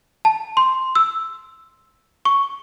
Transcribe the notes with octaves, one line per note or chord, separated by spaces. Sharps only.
A5
C6
E6
C#6